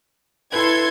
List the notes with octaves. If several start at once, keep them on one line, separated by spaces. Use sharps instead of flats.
E4 A4 B4 C6 G#6